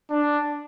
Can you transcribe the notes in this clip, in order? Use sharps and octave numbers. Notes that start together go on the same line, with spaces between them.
D4